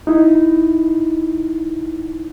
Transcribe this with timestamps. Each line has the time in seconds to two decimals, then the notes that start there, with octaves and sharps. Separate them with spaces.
0.07 D#4 E4